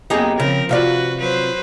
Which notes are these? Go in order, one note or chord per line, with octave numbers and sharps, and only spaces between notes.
F#2 A#3 B3 D#4 G4 G#4
C#3 F3 C4 A#4
C3 F4 F#4 B4 D5
F#3 B4 C5